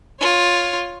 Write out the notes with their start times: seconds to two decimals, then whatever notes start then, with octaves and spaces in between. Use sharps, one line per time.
0.20 F4 C#5